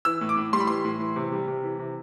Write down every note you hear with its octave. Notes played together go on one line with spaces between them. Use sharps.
E3 E6
A2
D6
A2
G3 C6
B5
E3 C6
A2
E3
C3
G3
C3
E3
C3